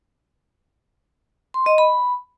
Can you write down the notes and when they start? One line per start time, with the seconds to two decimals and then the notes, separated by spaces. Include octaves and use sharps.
1.54 C6
1.66 D#5
1.78 B5